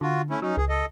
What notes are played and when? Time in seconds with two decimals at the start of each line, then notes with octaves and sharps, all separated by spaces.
0.01 D3 F4 F#4
0.30 A3 C#4 E4
0.42 F#3 C#4 D#4
0.57 C#2 G#4
0.69 A4 D#5